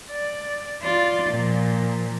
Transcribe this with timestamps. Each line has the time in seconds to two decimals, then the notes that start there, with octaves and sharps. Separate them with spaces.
0.11 D5
0.83 F4 D5
1.31 A#2 F3